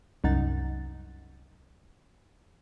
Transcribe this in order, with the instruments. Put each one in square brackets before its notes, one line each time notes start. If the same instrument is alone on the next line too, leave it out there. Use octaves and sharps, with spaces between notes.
[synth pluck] C2 F#2 D#4 F#5 A6